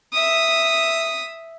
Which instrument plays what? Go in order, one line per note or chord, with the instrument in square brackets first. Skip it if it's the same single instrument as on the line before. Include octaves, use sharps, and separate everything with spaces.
[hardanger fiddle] E5 D#6